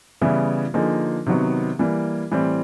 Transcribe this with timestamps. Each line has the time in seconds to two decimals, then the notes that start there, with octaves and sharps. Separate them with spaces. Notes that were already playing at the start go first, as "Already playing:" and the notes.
0.22 C#3 E3 G3 B3 E4
0.74 D3 F3 A#3 D#4 G#4
1.26 C3 D#3 F#3 B3
1.79 E3 G3 A#3
2.31 A2 E3 G3 C4